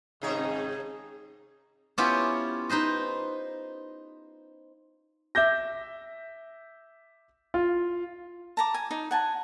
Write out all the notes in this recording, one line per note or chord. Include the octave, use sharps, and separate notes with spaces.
G#1 C3 D#4 G#4 C#5
B3 C#4 E4 F4 G4 C#5
D#4 B4 C5 D#5
E5 D6 G6 A#6
F4
A5 A#5 D6
G#5
D#4
F#5 G#5 A5